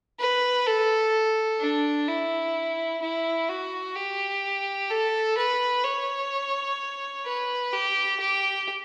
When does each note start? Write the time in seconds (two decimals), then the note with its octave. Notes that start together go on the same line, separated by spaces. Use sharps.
0.20 B4
0.66 A4
1.60 D4
2.08 E4
3.02 E4
3.49 F#4
3.95 G4
4.90 A4
5.37 B4
5.84 C#5
7.26 B4
7.73 G4
8.20 G4